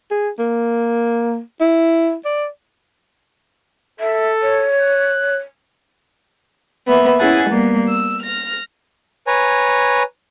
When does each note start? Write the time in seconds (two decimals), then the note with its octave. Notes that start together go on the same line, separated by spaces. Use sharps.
0.11 G#4
0.39 A#3
1.61 E4
2.25 D5
4.00 A4 E5
4.42 C#5
4.80 F#6
6.87 A#3 B3 E5
7.18 C#4 E4 G#4 F#5 G#5 A5
7.49 G3 A#3 B3
7.89 E6
8.22 F6 A#6
9.27 B4 C#5 G#5 A#5